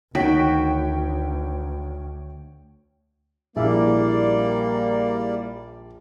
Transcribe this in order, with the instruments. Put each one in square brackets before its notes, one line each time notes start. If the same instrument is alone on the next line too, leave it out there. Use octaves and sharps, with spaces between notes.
[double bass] D2 [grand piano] D#3 [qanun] F#4 [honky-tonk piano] C#5 G5 B6
[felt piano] A#1 [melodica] G3 D5 [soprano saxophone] A#3 [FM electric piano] E4 G#4 E5